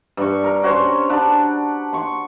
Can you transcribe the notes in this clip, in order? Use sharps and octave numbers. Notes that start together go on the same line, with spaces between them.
G2 C#6
A#4
C#4 F#4 C5 C#5
D4 F#5 A5 B5
C6 C#6